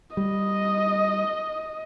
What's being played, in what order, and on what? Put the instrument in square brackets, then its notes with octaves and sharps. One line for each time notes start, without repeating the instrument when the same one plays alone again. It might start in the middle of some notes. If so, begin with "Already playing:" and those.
[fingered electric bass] G3 [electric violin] D#5